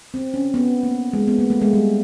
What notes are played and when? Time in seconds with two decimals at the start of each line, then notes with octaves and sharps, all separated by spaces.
0.14 C4
0.34 C#4
0.54 B3
0.83 A#3
1.13 G#3
1.28 B3
1.38 A#3
1.50 A3
1.61 G#3
1.73 G3